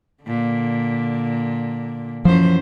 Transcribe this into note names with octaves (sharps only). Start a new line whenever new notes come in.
A#2 D3
F#2 E3 F3 C5